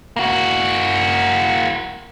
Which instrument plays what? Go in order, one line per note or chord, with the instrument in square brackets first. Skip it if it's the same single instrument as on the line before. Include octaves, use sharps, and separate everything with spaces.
[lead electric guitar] A#3 F#4